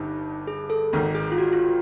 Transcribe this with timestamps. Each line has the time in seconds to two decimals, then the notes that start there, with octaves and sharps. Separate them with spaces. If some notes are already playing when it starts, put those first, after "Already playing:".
Already playing: G1 G2 D#4
0.47 G#4
0.70 A4
0.93 G#1 G#2 D#3
1.15 G#4
1.32 F4
1.38 F#4
1.53 F4